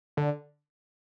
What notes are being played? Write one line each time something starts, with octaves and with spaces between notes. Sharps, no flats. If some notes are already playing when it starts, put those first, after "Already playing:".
D3